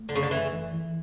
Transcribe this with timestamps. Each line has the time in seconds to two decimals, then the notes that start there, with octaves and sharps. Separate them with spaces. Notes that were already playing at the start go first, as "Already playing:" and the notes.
Already playing: A3
0.09 F#2 D3
0.15 C#3
0.23 D3
0.30 F#2 E3
0.53 E3
0.73 E3